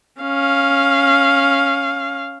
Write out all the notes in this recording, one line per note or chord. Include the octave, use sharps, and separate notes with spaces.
C#4 F5